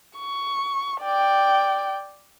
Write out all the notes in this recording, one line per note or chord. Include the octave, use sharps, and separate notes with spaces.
C#6
D5 G5